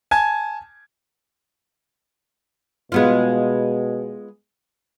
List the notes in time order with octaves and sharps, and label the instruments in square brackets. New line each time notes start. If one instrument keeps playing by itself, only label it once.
[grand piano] G#5 A5 G#6
[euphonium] B2 [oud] G#3 B3 F4